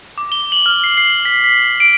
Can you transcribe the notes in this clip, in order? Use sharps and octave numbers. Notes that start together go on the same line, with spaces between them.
D6
G7
F#7
F6
C7
C7
B6
B6
D7